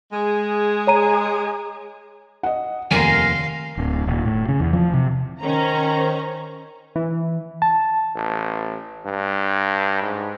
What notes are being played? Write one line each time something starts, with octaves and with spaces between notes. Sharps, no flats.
G#3 G#4
C#5 A#5 D#7
D#5 F#5
F1 D#2 A#4 F5 G#5 C6
D1
D#1
A2
C#3
E2
F3
C3
D#3 C#4 C5 A#5
E3
A5
A1
G2
G#2